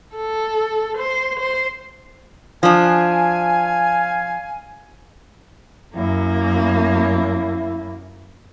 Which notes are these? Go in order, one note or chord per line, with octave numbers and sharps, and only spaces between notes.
A4
C5
C5
F3 D4 F5 G#5
F#2 A#3 E4